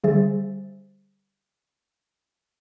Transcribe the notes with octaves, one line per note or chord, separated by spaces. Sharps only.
D3 G3 G#4 C5 E5 A6